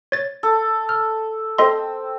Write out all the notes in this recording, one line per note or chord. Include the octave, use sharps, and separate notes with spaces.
C#5 A6
A4
F6
C4 A4 D#5 C6